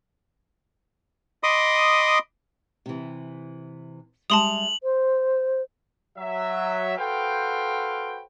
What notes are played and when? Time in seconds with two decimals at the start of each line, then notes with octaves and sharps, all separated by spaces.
1.43 D#5 B5 C6 D6 D#6
2.86 C3 E3
4.30 G3 G#3 E5 A5 C6 D#6 F7 F#7
4.82 C5
6.18 F#3 E5
6.98 F#4 A4 B4 C5 F5 G5